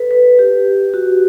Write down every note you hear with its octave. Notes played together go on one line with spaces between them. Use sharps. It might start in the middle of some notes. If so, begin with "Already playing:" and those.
Already playing: A4 B4
B4
G4
F#4